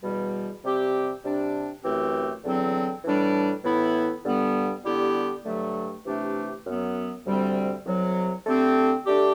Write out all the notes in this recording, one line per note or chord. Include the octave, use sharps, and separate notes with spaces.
E2 B2 G3
C3 G3 C4 G4
C3 G3 D4
F#2 E3 A3 C4 G4
E2 D3 F#3 C4
A2 E3 G3 D4
A2 E3 B3 E4
G2 D3 G3 B3
D3 G3 B3 E4 G4
G2 D3 F#3 A3
C3 E3 A3 D4 G4
F#2 F#3 B3
D2 C3 G3 C4
C2 C3 F#3
D3 A3 C4 G4
D3 A3 D4 G4